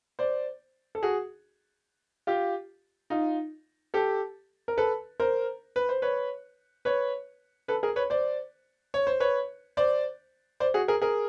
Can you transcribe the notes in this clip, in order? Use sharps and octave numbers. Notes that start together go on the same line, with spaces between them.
C5 D5
A4
F#4 G#4
F4 G4
D#4 F4
G4 A4
A#4
A4 B4
A#4 C5
B4
C5
B4 C#5
B4 C#5
A4 B4
G#4 A#4
B4 C#5
C5 D5
C#5
C5
B4 C#5
C5 D5
C5 D5
F#4 G#4
G#4 A#4
G#4 A#4